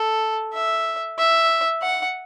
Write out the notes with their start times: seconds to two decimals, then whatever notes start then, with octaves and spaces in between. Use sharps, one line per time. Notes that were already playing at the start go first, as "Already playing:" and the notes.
Already playing: A4
0.53 E5
1.18 E5
1.82 F#5